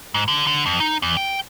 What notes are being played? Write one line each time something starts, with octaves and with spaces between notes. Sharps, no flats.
G#2
D3
D3
F2
D#4
E2
G5